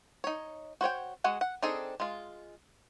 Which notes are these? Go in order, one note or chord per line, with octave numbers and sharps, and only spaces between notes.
D#4 C#5
F#4 C5 C#5 G5
G#3 F#4 F#5 G#5
F#5
C4 D4 D#4 G#4 A4
G#3 F4